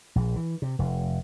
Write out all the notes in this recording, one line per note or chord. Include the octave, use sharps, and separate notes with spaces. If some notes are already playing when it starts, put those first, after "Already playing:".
A#1
E3
C3
F1